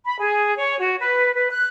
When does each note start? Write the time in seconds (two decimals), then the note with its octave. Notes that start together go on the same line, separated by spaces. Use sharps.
0.05 B5
0.20 G#4
0.57 C#5
0.79 F#4
1.00 B4
1.35 B4
1.50 F#6